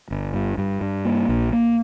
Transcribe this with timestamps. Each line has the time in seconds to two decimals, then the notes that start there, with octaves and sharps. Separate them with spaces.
0.11 G1
0.34 G2
0.58 G2
0.81 G2
1.05 A#3
1.29 A#1
1.53 A#3